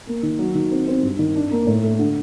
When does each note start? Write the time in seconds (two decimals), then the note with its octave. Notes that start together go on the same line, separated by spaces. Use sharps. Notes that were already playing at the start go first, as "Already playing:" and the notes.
0.07 A#3
0.23 D#3
0.39 F#3
0.55 D#3
0.71 C4
0.88 C4
1.03 G2
1.19 D#3
1.35 D4
1.51 A#3
1.67 A2
1.83 A3
1.99 D3